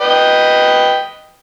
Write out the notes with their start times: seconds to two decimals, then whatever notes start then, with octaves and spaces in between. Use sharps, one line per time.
0.01 B4 D#5 G5